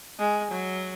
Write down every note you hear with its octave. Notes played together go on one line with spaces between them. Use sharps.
G#3
F#3